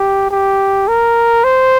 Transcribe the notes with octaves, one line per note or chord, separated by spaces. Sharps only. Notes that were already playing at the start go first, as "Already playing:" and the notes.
Already playing: G4
G4
A#4
C5